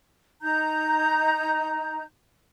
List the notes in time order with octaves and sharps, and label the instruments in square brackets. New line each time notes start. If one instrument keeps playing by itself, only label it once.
[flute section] D#4 A#5 G6